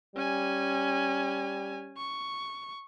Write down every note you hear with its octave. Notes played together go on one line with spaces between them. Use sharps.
G3 C#4 G#5
C#6